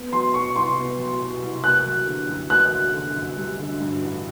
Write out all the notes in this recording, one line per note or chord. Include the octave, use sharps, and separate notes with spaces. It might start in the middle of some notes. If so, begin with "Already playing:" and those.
Already playing: B3
F#3 C6
B2 C#6
C2 C6
B3
F#3
B2
C2
A#3 F#6
F#3
D3
F#2
A#3 F#6
F#3
D3
F#2
G3
D3
G2
A1